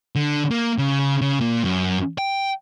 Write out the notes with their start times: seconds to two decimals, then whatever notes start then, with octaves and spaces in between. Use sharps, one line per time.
0.16 D3
0.51 A#3
0.78 C#3
1.21 C#3
1.41 A#2
1.63 F#2
2.18 G5